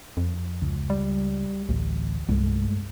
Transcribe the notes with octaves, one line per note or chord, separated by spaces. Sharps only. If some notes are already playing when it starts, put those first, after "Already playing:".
F2
C#2
G3
A1 D2
C2 G2 G#3 A3